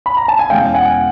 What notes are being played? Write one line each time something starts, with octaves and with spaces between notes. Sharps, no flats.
B5
A#5
A5
G#5
E2 B2 G#3 C#4 F5 G5
F#5 G#5